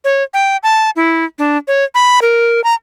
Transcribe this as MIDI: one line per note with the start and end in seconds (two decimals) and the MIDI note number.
0.04 0.23 73
0.34 0.57 79
0.63 0.90 81
0.96 1.25 64
1.39 1.57 62
1.68 1.84 73
1.95 2.20 83
2.22 2.63 70
2.64 2.75 82